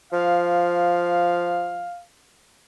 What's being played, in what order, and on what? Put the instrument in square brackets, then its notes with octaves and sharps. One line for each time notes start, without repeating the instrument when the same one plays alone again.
[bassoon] F3 [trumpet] F5